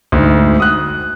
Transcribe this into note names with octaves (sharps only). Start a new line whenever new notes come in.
D2 G#2
D#6 F#6